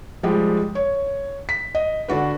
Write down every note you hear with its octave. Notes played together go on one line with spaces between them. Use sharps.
F3 G3 G#3 G4
C#5
B6
D#5
D3 D4 F#4 B4